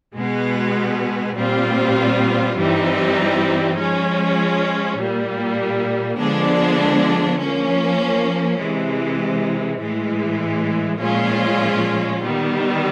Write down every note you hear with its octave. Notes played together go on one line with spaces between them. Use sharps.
B2 G#3 B3
A#2 G3 C4 F4
G2 E3 G3 C4 D#4
F3 G#3 C#4
A#2 G3 A#3
D3 F3 G#3 B3 D4
F3 A#3 C#4
C3 E3 G#3
A2 E3 G#3
A#2 F3 G#3 C#4 F4
D#3 G3 B3